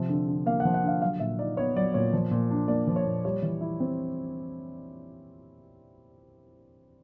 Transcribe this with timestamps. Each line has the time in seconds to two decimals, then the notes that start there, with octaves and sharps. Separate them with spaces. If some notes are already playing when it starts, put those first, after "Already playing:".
Already playing: C3 F3
0.09 D3
0.28 D3
0.46 A#3 F5
0.60 F#5
0.65 F3
0.74 F#5
0.84 D3 F5
1.01 F#3 F5
1.20 A#2 E5
1.39 D#4 D5
1.57 B3 C#5
1.76 F#3 D5
1.94 A#2 C#5
2.13 F3
2.31 A#2
2.51 D4
2.68 A#3 D5
2.87 F3
2.96 C#5
3.06 A#2
3.25 G3 C#5
3.42 E3
3.61 E4
3.80 C4